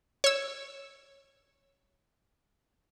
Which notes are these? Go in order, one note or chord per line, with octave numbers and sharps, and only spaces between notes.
C#5 E6